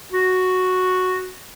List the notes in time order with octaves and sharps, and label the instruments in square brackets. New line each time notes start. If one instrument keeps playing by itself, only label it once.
[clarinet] F#4